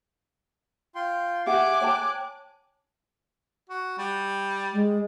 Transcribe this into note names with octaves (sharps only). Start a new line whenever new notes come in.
F4 G5 C6
G4 E5 F#5 G#5 D6 F#6
C#5 G5 A5
F#4
G3
G#3